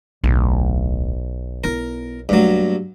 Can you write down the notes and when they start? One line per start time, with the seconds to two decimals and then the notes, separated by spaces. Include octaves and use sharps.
0.24 D1 B1
1.64 B3 E4 A#4
2.29 G2 F#3 A3 A#3